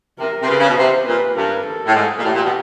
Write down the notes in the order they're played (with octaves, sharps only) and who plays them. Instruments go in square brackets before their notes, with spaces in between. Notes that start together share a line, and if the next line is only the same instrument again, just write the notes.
[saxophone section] C3 [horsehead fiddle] A#4
[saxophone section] C3
[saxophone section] C#3 [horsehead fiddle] B4
[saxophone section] C#3
B2
[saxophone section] C3 [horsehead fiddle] C5
[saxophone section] A#2 [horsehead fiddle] B4
[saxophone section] G2 [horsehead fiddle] A#4
[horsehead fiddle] A4
[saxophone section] A2
[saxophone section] G#2 [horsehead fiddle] A4
[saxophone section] A#2
[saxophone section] A2 [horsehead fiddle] G4
[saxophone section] A#2
B2